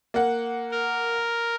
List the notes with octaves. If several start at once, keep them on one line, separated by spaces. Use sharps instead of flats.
A#3 F#5
A#4